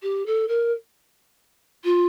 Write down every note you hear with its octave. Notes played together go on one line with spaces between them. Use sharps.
G4
A4
A#4
F4